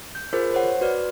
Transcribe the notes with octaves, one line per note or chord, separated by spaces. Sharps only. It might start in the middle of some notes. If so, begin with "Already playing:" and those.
G6
F4 G#4 A#4 C5
C5 C#5 F#5
F#4 B4 D5